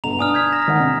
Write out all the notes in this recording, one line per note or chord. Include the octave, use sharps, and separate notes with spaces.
G1 B2 D3 A#5 F7
D4 G#5 D#6 F6
G6 G#6 B6
A#5 A#6
D#3 D#4 F#5
C3